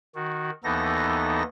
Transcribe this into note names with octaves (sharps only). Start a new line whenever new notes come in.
D#3 F#4
D#2 E3 B3 D#4 A4 A#6